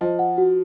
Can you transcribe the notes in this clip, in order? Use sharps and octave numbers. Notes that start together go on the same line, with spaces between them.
F3 D#5
F#5
F#4